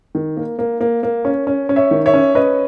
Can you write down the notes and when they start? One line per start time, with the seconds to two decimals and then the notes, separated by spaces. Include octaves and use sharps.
0.15 D#3
0.37 A#3
0.59 A#3
0.81 A#3
1.03 A#3
1.25 C#4
1.47 C#4
1.69 C#4
1.76 C#5 E5
1.91 D#3
2.06 C#5 E5
2.14 C#4
2.35 C#4 B4 D#5